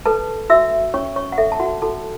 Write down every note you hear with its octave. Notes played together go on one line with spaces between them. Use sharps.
A4 B4 A5
F#4 E5 E6
C#4 C#5 C#6
C#5 C#6
F#5
A4 E5
A5
F#4 F#5
F#4 A4 A5